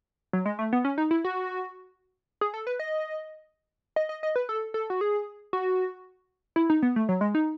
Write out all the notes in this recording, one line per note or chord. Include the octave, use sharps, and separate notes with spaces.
F#3
G#3
A3
B3
C#4
D#4
E4
F#4
G#4
A4
B4
D#5
D#5
D#5
D#5
B4
A4
A4
F#4
G#4
F#4
E4
D#4
B3
A3
F#3
G#3
D#4